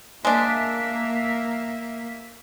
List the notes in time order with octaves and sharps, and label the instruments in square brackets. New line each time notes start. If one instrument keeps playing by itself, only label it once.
[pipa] G#3 D4 [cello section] A#3 E5